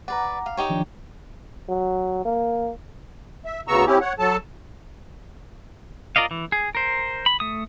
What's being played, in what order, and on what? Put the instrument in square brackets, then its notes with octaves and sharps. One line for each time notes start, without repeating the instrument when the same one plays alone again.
[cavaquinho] B4 D5 [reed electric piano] F#5 A#5
[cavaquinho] F5
D#4 G4 C#5
[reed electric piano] D#3 F3 D4
[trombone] F#3
A#3
[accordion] E5
D2 C#3 B3 A#5 C#6 E6
C4 C#4 E4 G4
C#5 F#5
F#3 A4 A5
[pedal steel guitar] F4 A#4 D5 D#5 F5
E3
G#4
A#4 C5
B5
A3 D#6